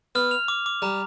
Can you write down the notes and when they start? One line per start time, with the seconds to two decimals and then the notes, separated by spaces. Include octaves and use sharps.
0.15 B3 F6
0.31 F7
0.48 D6
0.66 D6
0.82 G3 A#5